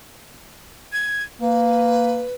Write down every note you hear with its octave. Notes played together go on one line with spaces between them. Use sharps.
G#6
A#3 B4